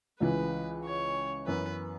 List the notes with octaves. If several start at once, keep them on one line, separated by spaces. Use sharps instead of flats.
C#2 C#3 E3 B4
C#5
F#2 E3 B3 B4